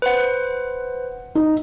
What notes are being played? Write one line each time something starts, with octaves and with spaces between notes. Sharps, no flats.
B4 C5 F#5
D#4